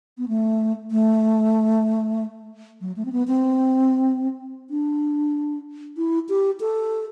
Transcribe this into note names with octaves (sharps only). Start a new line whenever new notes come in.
B3
A3
A3
F#3
A3
C4
B3
C4
D4
E4
G4
A4